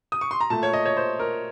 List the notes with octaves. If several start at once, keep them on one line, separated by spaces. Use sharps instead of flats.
D#6
C#6
C6
A#5
A#2 A3 A5
C#5
D#5
C#5
C5
A#4